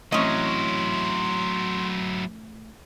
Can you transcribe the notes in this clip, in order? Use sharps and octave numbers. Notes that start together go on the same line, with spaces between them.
A2 E3 F#3 C4 C#4 E4 D#5 C6